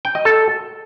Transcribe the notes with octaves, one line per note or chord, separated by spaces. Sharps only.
G5
D#5
A4